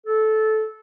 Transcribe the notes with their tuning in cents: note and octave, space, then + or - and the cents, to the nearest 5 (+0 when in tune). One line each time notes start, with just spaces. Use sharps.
A4 -15